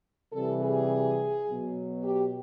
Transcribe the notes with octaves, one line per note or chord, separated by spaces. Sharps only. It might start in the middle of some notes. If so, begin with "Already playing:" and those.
C3 E3 G3 A4
G#4
B2 F#3
G4